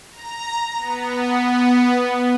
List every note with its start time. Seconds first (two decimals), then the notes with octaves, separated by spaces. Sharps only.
0.11 A#5
0.77 B3